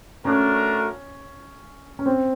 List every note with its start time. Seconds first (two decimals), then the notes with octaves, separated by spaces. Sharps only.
0.24 A3 C#4 D4 F#4 A#4
1.99 C#4
2.06 C4